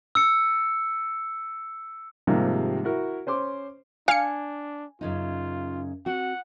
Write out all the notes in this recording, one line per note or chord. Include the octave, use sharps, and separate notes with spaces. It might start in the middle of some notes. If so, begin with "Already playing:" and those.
E6 C#7
G#2 C3 D#3 F3 G3 A#3
E4 F#4 A#4
C#4 C5 C6 D6
D4 F5 G#5 C#7
F#2 C#3 D#4 F4
C4 F#4 F#5